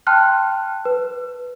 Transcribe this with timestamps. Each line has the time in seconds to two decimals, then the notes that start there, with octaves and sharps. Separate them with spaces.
0.07 G5 A5 C6 F6 F#6
0.85 B4